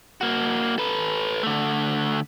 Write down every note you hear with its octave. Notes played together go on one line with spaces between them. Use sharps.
A#3 F#4
A4 B4
D3 A3